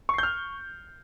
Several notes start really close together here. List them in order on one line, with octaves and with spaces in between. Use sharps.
C#6 C7 G6 F6